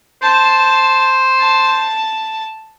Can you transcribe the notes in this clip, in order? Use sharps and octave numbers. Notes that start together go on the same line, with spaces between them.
C5 A5
A5